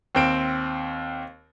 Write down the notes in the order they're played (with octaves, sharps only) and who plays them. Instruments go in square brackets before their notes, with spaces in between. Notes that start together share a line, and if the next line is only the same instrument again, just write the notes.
[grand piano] D#2 C4 D7